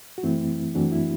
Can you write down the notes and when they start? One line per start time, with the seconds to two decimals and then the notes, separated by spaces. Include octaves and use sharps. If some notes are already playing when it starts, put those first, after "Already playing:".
0.18 F#4
0.23 F#2 E3 A3 C4 E4
0.75 F#2 E3 A3 C4 D4 F#4
0.92 E4